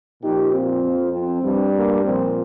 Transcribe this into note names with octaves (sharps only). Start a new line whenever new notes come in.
A#2 F3 D#4 G4
C4 F4
F2 F3
C4
G2 G3
A#3
A#2 F3 C4